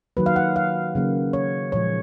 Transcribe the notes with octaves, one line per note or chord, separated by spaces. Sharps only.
D#3 F#3 A#3 B4
F5
F#5
F5
C#3 F#3 A#3
C#5
A#2 F3 G#3 C#5